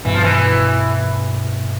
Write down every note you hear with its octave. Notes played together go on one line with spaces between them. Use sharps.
G2 B2 E3
F3
E3